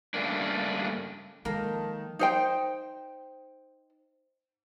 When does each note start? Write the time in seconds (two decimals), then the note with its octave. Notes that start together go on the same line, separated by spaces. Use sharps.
0.14 G2 C#3 A3 A#3 D4
1.45 D#3 F3 G#3 A#3 A5 A#5
2.19 D#4 C5 G5